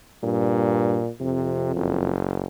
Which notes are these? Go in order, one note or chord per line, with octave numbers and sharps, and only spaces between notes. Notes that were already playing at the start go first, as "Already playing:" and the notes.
G2 A#2
F2 C3
F#1